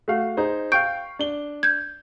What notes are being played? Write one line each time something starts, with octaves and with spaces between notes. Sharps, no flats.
A3 F#4 F5
D#4 G#4 C5
F5 G5 C#6 G6 D7
D4 G7
G6 G#6